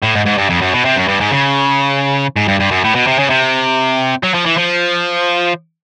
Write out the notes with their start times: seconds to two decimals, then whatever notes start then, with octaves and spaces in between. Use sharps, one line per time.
0.04 A2
0.16 G#2
0.26 G#2
0.38 G2
0.50 F2
0.61 F#2
0.73 B2
0.85 C3
0.96 F#2
1.08 G2
1.20 G#2
1.32 C#3
2.36 G#2
2.48 G2
2.60 G2
2.71 F#2
2.84 A2
2.95 B2
3.07 C3
3.19 C#3
3.30 C3
4.23 F#3
4.35 F3
4.46 E3
4.58 F3